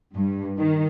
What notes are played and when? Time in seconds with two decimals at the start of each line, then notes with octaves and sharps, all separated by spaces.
0.15 G2
0.59 D#3